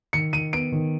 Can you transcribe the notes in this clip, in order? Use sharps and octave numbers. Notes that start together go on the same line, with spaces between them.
D#3 C#7
D#3 D#7
B3 D7
D#3